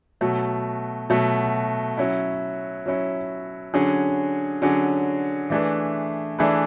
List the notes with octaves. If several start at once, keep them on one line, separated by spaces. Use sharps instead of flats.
B2 F#3 A3
B2 F#3 A3
F#3 C#4 E4
F#3 C#4 E4
D3 F#3 C#4 G#4
D3 F#3 C#4 G#4
E3 A3 D4 G#4 B4
E3 A3 D4 G#4 B4